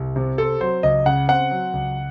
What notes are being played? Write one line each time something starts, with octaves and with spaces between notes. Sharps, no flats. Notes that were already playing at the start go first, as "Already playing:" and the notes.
Already playing: C2
C3
C4 A4
F#3 C5
C#2 D#5
C#3 F#5
C4 F#5
F#3
C#2